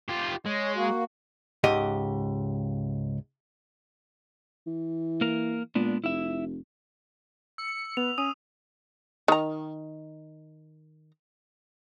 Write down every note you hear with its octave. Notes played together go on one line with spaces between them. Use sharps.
F4 G4
G#3 C#5
A#3 F#4
C#2 G#2 G4 D#5
E3
A#3 A#4
A#2 G#3 B3 D4
F1 E4 E5
E6 C#7
B3 F7
C#4 D#6 D#7
D#3 A#5